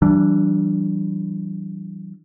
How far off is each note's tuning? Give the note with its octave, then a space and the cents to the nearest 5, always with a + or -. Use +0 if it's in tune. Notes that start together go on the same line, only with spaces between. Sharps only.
E3 +5 G3 -40 D4 +0